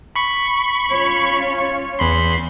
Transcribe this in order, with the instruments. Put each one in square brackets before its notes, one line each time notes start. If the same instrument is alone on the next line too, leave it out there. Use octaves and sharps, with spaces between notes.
[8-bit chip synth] B5 C#6
[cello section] C#4 F4 C#5
[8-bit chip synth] E2 B5 C6